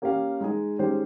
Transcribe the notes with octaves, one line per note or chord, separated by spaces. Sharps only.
A#3 C#4 G4 C#5 F5
G#3 D#4 G#4
D#3 G#3 C#4 G4 C5